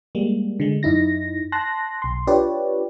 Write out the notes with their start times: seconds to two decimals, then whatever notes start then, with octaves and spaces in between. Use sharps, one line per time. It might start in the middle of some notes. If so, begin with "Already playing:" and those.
0.15 G3 G#3 A#3
0.60 D3 G#3
0.83 F#2 D#4 E4 A#6
1.52 A5 C6 F#6 A#6
2.02 B1 C6
2.27 D4 F4 G4 B4 C#5 D5